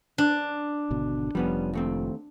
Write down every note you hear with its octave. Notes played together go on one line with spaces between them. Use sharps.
D4
G#1 B2 D3
F1 F3 G3 B3 C#4
D#2 A3 C4